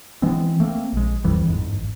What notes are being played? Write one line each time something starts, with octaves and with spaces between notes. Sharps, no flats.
E3 G#3 B3 C4
A3 A#3 C4
A#1 G#3
C2 F2 E3 G3
G1 E2 G#2